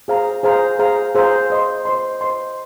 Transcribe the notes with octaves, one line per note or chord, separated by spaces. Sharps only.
G#4 C5 F5 A#5
G#4 C5 F5 A#5
G#4 C5 F5 A#5
G#4 C5 F5 A#5
C5 D#5 C6
C5 D#5 C6
C5 D#5 C6